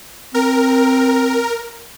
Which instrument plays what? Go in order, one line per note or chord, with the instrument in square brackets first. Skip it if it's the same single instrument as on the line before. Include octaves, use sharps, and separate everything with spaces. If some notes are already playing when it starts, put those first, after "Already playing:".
[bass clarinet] C4 [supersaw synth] A#4